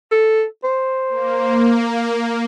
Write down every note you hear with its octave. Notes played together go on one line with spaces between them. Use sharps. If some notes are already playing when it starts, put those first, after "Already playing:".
A4
C5
A#3